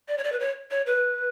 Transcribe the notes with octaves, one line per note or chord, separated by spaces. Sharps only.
D5
C#5
D5
B4
C#5
C#5
B4